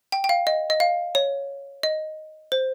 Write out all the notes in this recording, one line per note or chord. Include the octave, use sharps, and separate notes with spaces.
G5
G5
F5
D#5
D#5
F5
C#5
D#5
C5